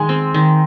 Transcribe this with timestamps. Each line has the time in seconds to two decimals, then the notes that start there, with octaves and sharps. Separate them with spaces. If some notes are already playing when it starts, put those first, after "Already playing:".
Already playing: D#3 G#3 G#5
0.09 C4
0.34 D#3